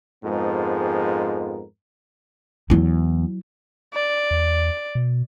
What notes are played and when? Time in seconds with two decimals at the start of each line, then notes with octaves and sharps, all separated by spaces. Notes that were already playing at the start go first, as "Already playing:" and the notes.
0.25 F2 G#2 F3 G#3 B3 A#4
2.70 E2 F#3 E4
3.93 D5
4.31 E2
4.95 B2